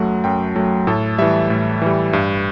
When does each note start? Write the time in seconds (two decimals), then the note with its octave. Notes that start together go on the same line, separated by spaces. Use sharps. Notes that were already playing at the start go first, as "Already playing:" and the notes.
Already playing: F#2 F#3 A3 F#5
0.24 F#2 G5
0.56 F#3 A3
0.87 A2 A4
1.18 E3 G3 E5
1.50 A2
1.82 E3 G3
2.13 G2